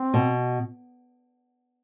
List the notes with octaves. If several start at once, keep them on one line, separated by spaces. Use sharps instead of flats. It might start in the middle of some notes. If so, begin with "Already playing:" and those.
Already playing: C4
B2